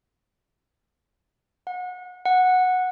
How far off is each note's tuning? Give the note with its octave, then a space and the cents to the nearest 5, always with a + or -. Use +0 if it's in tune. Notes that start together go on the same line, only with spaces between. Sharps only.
F#5 -30
F#5 -10